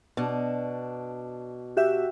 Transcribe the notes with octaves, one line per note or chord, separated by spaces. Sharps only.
B2 D4
F#4 G4 E5